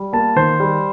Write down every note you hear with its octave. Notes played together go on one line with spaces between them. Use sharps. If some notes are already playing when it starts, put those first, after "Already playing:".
Already playing: G3
A#3 A5
D#3 C5
G3